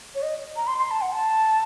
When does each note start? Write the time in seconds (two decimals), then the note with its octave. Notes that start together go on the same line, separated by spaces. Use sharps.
0.15 C#5
0.22 D#5
0.56 A#5
0.67 C6
0.78 C6
0.91 A5
1.02 F#5
1.12 A5